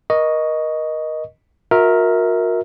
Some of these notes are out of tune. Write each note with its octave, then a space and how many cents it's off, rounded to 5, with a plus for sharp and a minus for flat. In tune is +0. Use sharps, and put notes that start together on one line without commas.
A#4 +30 D#5 +0 C#6 +5
F#4 -40 A#4 +0 E5 -25